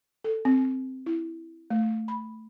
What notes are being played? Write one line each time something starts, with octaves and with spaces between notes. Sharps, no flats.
A4
C4
E4
A3
B5